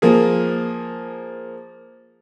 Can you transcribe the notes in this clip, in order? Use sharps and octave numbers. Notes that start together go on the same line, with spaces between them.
F3 A#3 G#4